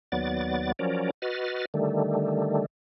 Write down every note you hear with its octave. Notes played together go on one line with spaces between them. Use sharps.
D#2 F#3 B3 D5 A6
F3 F#3 C#4 A#4 D5
F#4 B4 D#5 F6 A6
D3 D#3 G3 A3